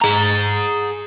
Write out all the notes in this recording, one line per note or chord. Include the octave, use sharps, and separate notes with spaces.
G#4 A#5